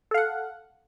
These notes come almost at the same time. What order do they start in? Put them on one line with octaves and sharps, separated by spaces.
A4 F5 F#5